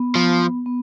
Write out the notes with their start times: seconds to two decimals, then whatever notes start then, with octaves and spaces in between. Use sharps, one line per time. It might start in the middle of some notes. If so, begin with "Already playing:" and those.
Already playing: B3
0.15 F3
0.66 B3